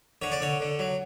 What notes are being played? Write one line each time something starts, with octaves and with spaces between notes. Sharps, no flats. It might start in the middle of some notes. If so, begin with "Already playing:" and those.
D3 C#5
D5
D3 C#5
D3
F#3